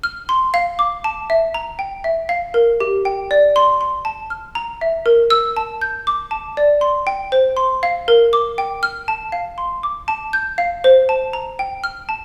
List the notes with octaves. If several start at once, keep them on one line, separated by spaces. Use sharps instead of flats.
F6
C6
F5
D6
A5
E5
A#5
G5
E5
F5
A#4
G4
G5
D5
C6
C6
A5
F6
A#5
E5
A#4
E6
A5
G6
D6
A5
D5
C6
G5
C5
C6
F5
A#4
D6
G5
F6
A5
F5
C6
D6
A5
G6
F5
C5
A5
A#5
G5
F6
A5